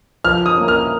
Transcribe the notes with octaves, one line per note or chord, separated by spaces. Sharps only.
F3 F6
D#6
A#3 C#4
F6